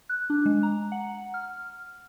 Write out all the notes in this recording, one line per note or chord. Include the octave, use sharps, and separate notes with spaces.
F#6
D4
G#3
A#5
F#5
F6